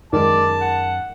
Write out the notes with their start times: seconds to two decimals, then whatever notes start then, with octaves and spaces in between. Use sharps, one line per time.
0.13 F#2 D#3 G#3 D5 A5
0.61 F#5